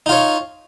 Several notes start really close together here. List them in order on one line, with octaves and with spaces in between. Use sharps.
D#4 F4 C#5